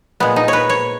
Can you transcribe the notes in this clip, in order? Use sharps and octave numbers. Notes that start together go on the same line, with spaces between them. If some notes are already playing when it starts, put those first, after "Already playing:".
A#2 G#3 B3
D#4
B4 C#5
C#5